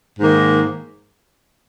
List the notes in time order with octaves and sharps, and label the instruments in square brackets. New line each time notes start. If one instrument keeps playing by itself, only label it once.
[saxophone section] G#2 D#3 A#3